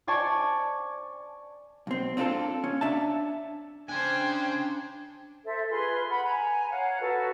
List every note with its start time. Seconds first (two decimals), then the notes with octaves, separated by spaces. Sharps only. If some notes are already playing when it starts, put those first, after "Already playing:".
0.07 C5 D5 G#5 A5 C#6
1.87 B1 C4
2.17 C4 D4 F4 G4 A4
2.64 C#4
2.81 D4 E5 A5
3.89 C#3 D4 C5 G5 G#5 G#6
5.45 A4 C5 E5
5.70 F4 G#4 B4 C6
6.09 F#5 B5
6.23 G#5 A#5
6.71 C#5 F5 F#5 A#5
7.01 F#4 A4 B4 A5